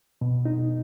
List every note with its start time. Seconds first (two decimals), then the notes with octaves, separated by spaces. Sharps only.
0.21 B2
0.45 D#4